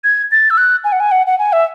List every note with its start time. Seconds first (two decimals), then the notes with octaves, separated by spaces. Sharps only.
0.04 G#6
0.32 A6
0.50 E6
0.57 F#6
0.84 G#5
0.92 F#5
1.00 G#5
1.11 F#5
1.27 F#5
1.39 G#5
1.53 E5